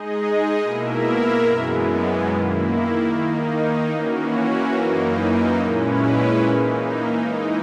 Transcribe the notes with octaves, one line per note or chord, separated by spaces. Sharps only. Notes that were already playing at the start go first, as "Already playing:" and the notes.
Already playing: G#3 D#4 G#4 D#5
B2 A#3 E4 A#4 E5
F#2 E3 G#3 B3
D#3 A#3 E4
D#3 A#3 D#4
E3 A#3 C#4 F#4
F#2 E3 A#3 D#4
A#2 G#3 C#4 E4 B4
E3 A#3 D#4
E3 G#3 D#4